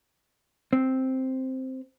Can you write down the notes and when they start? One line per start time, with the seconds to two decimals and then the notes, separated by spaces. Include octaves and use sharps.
0.73 C4